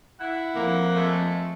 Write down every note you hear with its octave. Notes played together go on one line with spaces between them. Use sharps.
E4 F#5
F2 A#3
G#3 A3